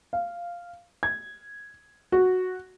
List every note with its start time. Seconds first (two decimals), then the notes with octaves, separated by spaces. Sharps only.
0.13 F5
1.03 G#6
2.12 F#4